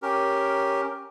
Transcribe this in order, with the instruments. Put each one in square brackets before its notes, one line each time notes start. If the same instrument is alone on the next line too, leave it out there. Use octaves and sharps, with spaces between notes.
[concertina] C#4 G4 A#4